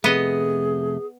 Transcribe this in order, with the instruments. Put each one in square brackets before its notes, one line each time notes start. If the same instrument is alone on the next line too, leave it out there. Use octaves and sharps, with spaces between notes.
[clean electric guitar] F2 C3 A3 [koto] B3 D#5 [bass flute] G#4